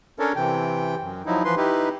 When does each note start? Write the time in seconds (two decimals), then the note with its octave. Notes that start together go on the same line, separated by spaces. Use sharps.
0.19 C#4 D4 A4 A#4 C#5
0.36 C3 E3 G5
1.01 F#2
1.26 F3 F#3 D#4 E4
1.45 E3 F3 B4 C6
1.57 D#4 E4 G4 B4